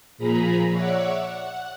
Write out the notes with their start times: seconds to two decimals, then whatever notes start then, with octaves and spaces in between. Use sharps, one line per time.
0.18 A#2 F3 G#4 A#5 B5
0.70 C#5 D5 E5 F#5
1.21 F#5